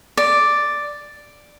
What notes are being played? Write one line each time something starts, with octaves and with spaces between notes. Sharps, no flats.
D5